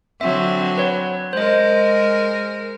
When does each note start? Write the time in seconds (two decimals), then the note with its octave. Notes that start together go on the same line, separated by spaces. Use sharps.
0.21 D3 F#3 C4 E5
0.78 B4 C#5
1.33 G#3 A#4 C5 D#5